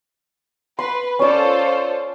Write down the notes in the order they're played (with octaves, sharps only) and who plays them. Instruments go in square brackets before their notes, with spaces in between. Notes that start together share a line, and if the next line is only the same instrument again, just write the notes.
[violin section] B4 [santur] C6
[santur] C#4 D5 [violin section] F4 A4 C5